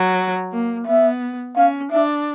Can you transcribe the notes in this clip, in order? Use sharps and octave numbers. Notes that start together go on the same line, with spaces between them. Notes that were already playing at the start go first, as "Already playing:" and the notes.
Already playing: F#3
A#3
B3 E5
C#4 F5
D4 E5